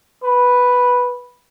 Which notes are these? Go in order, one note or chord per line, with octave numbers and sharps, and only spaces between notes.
B4